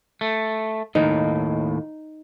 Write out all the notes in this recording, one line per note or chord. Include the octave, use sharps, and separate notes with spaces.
A3
D#2 A2 D#4